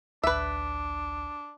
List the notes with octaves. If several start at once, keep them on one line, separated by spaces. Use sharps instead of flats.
A1 D2 D4 B4 E5